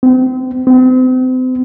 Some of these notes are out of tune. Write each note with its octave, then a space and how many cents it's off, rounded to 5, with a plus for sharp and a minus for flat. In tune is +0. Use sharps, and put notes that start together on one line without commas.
C4 -35
C4 -40